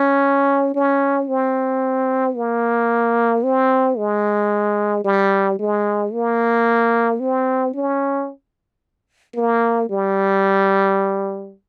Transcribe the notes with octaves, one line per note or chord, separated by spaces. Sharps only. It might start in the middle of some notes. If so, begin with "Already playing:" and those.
Already playing: C#4
C#4
C4
A#3
C4
G#3
G3
G#3
A#3
C4
C#4
A#3
G3